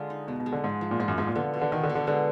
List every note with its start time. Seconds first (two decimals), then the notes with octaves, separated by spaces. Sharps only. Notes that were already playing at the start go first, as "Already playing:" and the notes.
Already playing: D3 G#3 F4
0.10 D#4
0.28 B2 G#3
0.40 B2
0.46 G#3
0.52 D3
0.64 G#2 F3
0.81 F3
0.91 A#2
1.00 G#2 F4
1.08 F#2
1.18 G#2 F3
1.27 A#2
1.35 D3 B3
1.54 B2
1.61 D3
1.72 B2 D#3
1.83 D3
1.90 B2
1.95 D3
2.07 D3 G#3